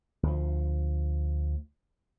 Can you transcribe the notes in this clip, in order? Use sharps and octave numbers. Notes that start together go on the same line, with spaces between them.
D2 F3